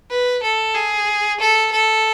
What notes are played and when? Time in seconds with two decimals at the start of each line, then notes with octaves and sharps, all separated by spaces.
0.10 B4
0.43 A4
0.75 G#4
1.40 A4
1.72 A4